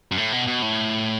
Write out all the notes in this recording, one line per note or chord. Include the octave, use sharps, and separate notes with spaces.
F#2
A2
B2
B2
A2